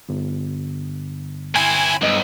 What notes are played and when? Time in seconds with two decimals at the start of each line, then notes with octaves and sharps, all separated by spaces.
0.09 G1
1.56 C4 E4 G#5
2.02 B1 G2 D#5